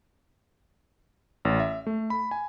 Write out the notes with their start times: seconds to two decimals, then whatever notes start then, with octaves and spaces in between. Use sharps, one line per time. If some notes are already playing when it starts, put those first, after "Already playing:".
1.45 A1
1.60 E5
1.87 A3
2.10 B5
2.31 G#5